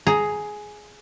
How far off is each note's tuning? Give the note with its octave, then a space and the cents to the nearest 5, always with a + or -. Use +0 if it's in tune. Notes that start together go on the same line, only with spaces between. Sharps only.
G#4 +10 A#5 +0